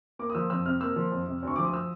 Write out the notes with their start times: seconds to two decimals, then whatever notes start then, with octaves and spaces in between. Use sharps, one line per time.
0.19 A#3 D6
0.30 D#6
0.35 F3 E6
0.50 F2 E6
0.65 C3 F6
0.81 A#3 E6
0.96 F3
1.12 F2
1.27 C3
1.43 D2 C#6
1.56 F3 D6
1.65 D#6
1.73 E6